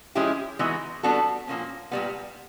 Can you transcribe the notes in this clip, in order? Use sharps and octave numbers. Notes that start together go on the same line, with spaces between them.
F3 G#3 C#4 E4 G4
E3 G#3 B3 D#4 F#4
G3 B3 D4 F#4 A4
A#2 F3 A#3 C#4
A#2 G3 B3